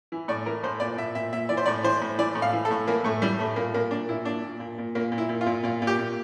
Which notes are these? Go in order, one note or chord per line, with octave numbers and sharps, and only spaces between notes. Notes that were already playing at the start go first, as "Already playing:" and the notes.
E3
A2 D5
E3 A#4
A2 C5
A#2 D5
A#2 E5
A#2 E5
A#2 E5
E3 D5
C5
A2 D5
E3 C5
A2
E3 D5
A2
F5
E3
A4
A2
E3 A#3
A2 A3
E3 G3
A2 A3
A#2 A#3
A#2 A#3
A#2 D4
A#2 E4
A#2 D4
A#2
A#2
A#2
A#2 A#3
A#2
E4
A#2
F4
A#2
A#2 F4
A#2
G4
A#2